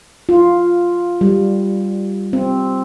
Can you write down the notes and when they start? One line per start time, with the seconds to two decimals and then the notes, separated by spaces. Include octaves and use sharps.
0.29 F4
1.21 G3
2.33 C4